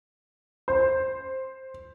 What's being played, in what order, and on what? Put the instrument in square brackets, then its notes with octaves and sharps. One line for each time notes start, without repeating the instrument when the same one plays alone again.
[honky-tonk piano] C5